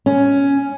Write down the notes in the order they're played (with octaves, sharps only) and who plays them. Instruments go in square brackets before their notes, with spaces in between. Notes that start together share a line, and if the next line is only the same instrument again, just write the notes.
[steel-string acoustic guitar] C#4